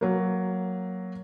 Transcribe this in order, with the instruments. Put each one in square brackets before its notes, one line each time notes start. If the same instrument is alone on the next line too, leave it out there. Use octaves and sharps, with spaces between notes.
[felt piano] F#3 A#3